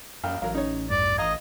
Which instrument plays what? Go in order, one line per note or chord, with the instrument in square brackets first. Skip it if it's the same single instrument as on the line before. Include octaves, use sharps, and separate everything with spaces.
[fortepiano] A#1 G5 F6 [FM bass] F#2 [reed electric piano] F5
[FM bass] A1 [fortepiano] F#3 A#4 [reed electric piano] F5
[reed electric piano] C#4 [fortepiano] D#4 C#5
[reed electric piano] E2 G2 [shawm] D5
[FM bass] A1 [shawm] D#5 [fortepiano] F5 A#5 [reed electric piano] D#6 G#6